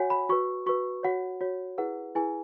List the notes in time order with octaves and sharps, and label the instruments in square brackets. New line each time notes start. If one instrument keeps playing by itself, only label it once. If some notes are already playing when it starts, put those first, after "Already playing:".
Already playing: [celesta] F#4 C#5 F#5 G#5
B5
F#4 B4 C#6
F#4 B4 C#6
F#4 C#5 F#5
F#4 C#5
E4 G#4 B4 F#5
E4 G#4 B4 G#5